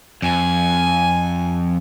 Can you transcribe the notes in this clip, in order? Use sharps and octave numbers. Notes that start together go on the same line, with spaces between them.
F2 G#5